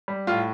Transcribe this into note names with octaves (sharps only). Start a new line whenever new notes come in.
G3
A2 F4